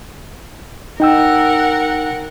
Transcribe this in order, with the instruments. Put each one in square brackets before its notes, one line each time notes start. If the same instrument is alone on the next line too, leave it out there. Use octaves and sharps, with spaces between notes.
[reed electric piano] D#4 G5 E6 [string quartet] A#4 F#5